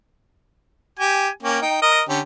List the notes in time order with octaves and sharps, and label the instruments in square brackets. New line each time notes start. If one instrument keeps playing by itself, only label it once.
[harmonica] G4 G#5
A#3 C#4 G5
D#4 G5
A#4 D#5
D3 C#4 G4